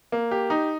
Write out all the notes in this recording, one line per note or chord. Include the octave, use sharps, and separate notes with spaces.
A#3
G4
D#4